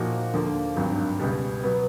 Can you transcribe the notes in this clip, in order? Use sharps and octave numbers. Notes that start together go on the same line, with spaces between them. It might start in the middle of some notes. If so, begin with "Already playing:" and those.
Already playing: A#2 F3 A#3 D#4 F#4
D#2 D3 F3 A#3
G#1 G2 D#3 F#3
C#2 B2 G3
B2 F#3 B3